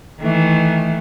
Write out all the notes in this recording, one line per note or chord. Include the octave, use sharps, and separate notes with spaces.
D#3 E3 A3